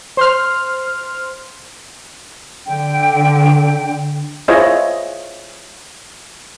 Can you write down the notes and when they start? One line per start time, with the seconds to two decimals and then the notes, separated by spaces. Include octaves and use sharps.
0.17 C5 C6 F6
2.67 D3 G5
4.48 E4 F4 G#4 C5 C#5 D#5